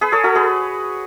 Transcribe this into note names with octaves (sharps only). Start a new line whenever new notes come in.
G#4 B4
A4 C#5
F#4 A4
G#4 B4